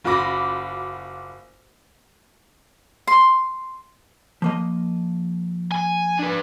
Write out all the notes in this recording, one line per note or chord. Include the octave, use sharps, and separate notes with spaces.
F#1 F4 F#4 B5 D6 A#6
C6
F3 A#3 D#5
G#5
D4 B4